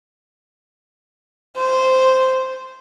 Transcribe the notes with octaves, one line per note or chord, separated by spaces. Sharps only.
C5